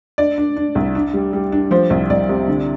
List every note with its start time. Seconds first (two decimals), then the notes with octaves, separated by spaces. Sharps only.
0.18 D4 D5
0.38 D4
0.56 D4
0.75 C2
0.95 D4
1.14 G3
1.33 G3
1.52 D4
1.71 F3 C5
1.90 C2
2.10 C2 D5
2.29 C3
2.48 D3